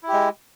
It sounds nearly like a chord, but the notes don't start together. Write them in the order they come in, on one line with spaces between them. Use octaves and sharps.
E4 G4 G#3